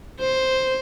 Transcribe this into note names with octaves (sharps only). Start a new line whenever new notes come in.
C5